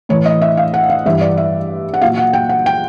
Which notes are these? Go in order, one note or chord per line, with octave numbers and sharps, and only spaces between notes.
A2 E3 C#5
D#5
E5
F5
F#5
F5
G2 E3 E5
D5
E5
F#5
A#2 F#3 F5
F#5
G5
F#5
G5